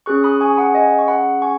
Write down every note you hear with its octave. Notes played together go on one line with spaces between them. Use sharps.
C#4 G#4 C#6 F#6
B5 D#6
G#5 C#6
F#5 B5
D#5 G#5
C#6
F#5 B5
G#5 C#6